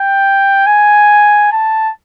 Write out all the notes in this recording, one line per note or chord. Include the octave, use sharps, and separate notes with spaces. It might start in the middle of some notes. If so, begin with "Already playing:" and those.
Already playing: G5
G#5
A5